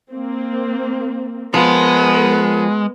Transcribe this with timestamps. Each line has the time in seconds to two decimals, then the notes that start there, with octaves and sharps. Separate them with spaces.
0.11 A#3 C4
1.54 F3 G#3 B3 A#4